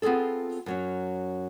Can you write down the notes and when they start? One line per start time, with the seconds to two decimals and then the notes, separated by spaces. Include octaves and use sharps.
0.02 B3 C4 F4 G#4 A4
0.66 F#2 F#3 C#4